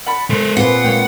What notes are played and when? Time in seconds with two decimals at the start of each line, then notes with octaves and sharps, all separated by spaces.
0.06 F#5 A5 B5
0.30 G#3 A4 A#4 C5
0.57 A#2 C4 F4 G#4 B4 F#5
0.85 G#3 A#3 C#5 G5